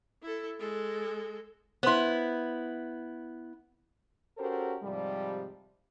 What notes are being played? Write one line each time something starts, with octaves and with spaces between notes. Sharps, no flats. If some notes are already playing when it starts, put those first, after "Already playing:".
E4 A4
G#3 A4
B3 E4 C5 C6
C#4 F#4 G4 A4 A#4 C5
G#2 C3 F3 G3